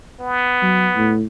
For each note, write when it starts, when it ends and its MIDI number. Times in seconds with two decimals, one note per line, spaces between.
0.20 1.14 59
0.62 0.89 54
0.95 1.24 45